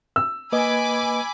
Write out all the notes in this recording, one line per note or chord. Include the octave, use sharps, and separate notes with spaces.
E6
A#3 B4 D#5 G#5 B5 D6